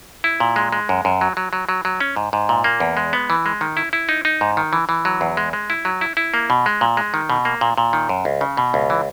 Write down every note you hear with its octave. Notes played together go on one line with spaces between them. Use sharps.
E4
A#2
G#3
G#3
F#2
F#2
F#3
F#3
F#3
F#3
F#3
C#4
G#2
G#2
A#2
A#3
E2
G#3
B3
E3
G#3
D#3
E4
E4
D#4
D#4
G#2
D#3
E3
E3
F#3
E2
G#3
G#3
E4
F#3
E4
E4
A#3
B2
G#3
A#2
G#3
D#3
B2
A#3
A#2
A#2
D#3
F#2
C#2
C#3
B2
C#2
E3